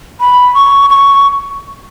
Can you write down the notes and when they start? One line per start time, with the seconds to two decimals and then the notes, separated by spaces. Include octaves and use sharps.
0.20 B5
0.54 C#6
0.90 C#6